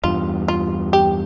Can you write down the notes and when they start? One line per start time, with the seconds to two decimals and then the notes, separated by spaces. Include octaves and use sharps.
0.04 E2 G2 F4
0.48 F4
0.93 G4